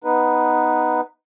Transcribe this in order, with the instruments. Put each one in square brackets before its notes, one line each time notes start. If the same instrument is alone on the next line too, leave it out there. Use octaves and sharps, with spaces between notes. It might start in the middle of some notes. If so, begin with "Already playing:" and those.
[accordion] B3 D#4 B4